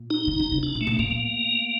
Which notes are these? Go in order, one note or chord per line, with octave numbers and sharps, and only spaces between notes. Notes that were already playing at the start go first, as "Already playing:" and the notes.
Already playing: A#2
D#4
D3
D3
C3
D4
A#2
A3
A#2
A2 A#3
A#2